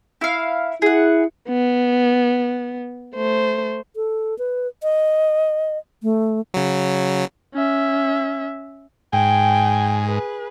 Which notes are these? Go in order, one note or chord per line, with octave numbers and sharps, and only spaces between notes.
E4 F5
E4 G#4 F#5
B3
A3 C5
A4
B4
D#5
A3
C#3 F#3
C#4 E5
G#2 G5 G#5
G#4 B4